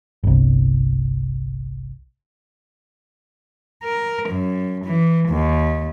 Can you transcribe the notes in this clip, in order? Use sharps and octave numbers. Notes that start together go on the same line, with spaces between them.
G1 C2
A#4
F#2
E3
D#2